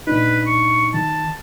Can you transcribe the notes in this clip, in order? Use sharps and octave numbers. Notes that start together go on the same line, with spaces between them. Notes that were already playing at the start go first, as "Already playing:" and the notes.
A#2 D4 D#4 B4
C#6
D#3 A5